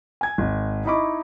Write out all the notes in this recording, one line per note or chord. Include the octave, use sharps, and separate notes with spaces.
G#5 G#6
G#1
D#4 E4 D#5 B5 C#6 D6